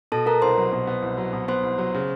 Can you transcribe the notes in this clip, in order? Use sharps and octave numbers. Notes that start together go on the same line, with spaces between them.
B2 A4 A5
B3 A#4 A#5
C2 C5 C6
F#3
B2
B3
C2
F#3
B2
B3 C5 C6
C2
F#3
C#3